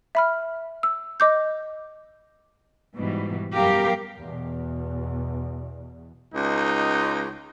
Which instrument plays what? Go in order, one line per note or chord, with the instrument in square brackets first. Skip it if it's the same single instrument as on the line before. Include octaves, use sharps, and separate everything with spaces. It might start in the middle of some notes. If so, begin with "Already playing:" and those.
[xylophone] E5 B5 F6
E6
D#5 D6 G6
[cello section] G#2 B2 E3 G3
F#2 G3 B3 G4 A#4 F5
[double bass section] E2 B2
[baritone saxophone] C#2 [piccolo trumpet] D#4